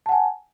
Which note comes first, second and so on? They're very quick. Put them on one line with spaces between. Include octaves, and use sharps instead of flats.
A5 F#5 G#5